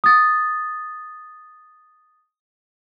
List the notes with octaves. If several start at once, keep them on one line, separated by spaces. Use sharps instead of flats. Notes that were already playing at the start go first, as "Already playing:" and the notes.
D#6 A6